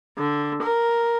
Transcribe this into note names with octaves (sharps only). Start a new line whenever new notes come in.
D3
A#4